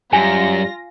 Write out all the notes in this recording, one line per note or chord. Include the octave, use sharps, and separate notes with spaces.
F#2 G3 F4 G#5 A#6